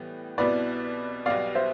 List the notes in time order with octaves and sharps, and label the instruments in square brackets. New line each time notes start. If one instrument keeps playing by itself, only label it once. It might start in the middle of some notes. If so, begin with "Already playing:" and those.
Already playing: [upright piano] A2 E3 G3 B3
[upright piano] C2 B2 B3 E4 [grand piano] B4 D5
[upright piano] B1 B2 G3 B3 [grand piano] D5 F5
[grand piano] C5 E5